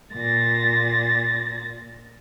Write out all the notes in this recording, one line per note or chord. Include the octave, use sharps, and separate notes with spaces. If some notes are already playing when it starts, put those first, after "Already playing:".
A#2 A6 A#6